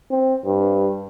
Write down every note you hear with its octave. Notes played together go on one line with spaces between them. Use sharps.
C4
G2